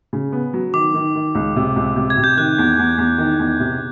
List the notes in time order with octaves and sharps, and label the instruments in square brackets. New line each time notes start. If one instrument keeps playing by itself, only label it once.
[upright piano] C#3
B3
F#3
[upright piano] D#3 [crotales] D6
[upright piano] D#3
D#3
C#2
C3
C#2
C3
[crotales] G#6
[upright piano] C3
[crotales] G6
[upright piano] D#3 [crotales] F#6
[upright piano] E2
E2
E2
D#3
E2
C3